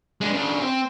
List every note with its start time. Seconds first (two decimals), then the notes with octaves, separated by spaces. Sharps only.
0.21 G#3 D4
0.34 C#3 D4
0.61 C4